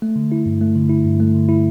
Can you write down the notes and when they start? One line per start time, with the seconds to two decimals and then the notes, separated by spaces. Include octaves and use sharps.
0.02 A3
0.16 D3
0.32 E4
0.46 G2
0.61 A3
0.76 D3
0.90 E4
1.05 G2
1.20 A3
1.35 D3
1.49 E4